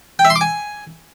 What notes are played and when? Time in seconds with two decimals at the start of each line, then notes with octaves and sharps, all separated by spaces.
0.19 G5
0.25 E5
0.30 C6
0.36 D6
0.41 G#5